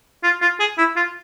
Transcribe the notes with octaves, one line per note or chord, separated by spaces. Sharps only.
F4
F4
G#4
E4
F4